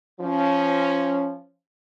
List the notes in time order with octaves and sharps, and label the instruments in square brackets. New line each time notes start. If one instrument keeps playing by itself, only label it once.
[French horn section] F3 C#4